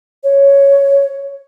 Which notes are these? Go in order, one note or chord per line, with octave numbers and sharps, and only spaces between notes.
C#5